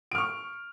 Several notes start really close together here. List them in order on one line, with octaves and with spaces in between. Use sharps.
D7 F6 C#6